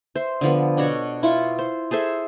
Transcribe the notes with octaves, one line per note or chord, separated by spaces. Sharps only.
C5 E5
D3 F3 B3
B2 D4 F#4 C#5
E4 F4 C#6
C5
G#4 A4 C5 E5